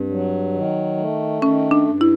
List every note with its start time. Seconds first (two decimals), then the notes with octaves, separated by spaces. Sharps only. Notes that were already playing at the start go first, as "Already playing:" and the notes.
Already playing: G2 C4
0.09 F#3
0.53 D#3
0.97 A3
1.42 D#3 C#4
1.71 D4
1.86 G2
2.01 E4